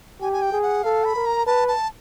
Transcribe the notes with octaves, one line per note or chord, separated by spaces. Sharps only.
G4 G#5
G#5
G5
G#4
F#5
A4 F5
B5
A#4
A#5
B4 A5
A5